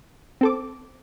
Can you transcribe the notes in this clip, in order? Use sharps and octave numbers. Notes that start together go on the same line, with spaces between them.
C4 A4 D6